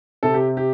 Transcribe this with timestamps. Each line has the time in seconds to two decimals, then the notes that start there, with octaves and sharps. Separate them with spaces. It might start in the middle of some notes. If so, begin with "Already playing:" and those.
0.23 C3 A4
0.34 G4
0.57 G4